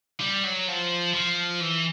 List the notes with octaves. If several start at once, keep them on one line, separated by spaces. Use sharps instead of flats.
G3
F#3
F3
F3
E3